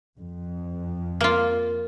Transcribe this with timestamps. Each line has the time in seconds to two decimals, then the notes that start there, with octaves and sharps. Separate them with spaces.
0.17 F2
1.21 A#3 F4